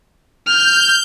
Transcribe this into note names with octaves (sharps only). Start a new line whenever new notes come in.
F6 G6